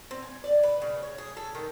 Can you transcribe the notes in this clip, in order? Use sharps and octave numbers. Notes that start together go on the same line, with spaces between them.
C4
G#5
D5
B4
C#3
C#5
G#4
A4
D#3